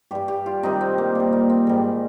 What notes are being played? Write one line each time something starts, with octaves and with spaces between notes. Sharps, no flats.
G2 G3 G4
G4
F4
C3 D#3 G3 D#4
C4
A#3
A#2 G3
A#3
C4
G#2 D#3 G3